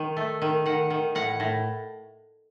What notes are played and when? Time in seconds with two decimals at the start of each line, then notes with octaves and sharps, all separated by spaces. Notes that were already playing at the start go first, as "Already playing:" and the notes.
Already playing: D#3
0.17 A3
0.42 D#3
0.66 D#3 F#5
0.90 D#3
1.15 A2 F#5
1.40 A2